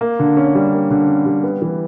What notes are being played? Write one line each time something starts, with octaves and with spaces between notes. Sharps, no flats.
A#3
D3
C#4
G3
A#3
D3
C#4
G3
B3
E3